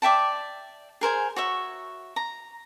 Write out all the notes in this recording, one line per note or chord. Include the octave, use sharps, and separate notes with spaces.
D5 E5 G5 A5
G#4 A#4 C5 G#5
F#4 C#5 E5
A#5